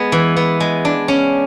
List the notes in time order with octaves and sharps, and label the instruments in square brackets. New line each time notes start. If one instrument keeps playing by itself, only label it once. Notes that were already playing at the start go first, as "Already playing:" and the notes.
Already playing: [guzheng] G#3 B3
E3
B3
G#3
D4
C#4